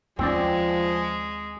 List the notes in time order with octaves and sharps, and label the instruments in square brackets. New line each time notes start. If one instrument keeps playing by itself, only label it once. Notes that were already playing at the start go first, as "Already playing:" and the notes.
[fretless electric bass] D#2 A3 C#4 [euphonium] F3 [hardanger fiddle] G#3 [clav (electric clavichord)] C4 D5